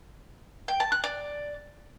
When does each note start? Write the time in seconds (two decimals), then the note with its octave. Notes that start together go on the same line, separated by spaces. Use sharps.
0.68 G5
0.80 A5
0.92 F#6
1.04 D5